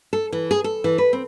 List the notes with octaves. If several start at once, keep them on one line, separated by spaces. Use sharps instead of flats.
A4
E3
G#4
A4
E3
B4
C4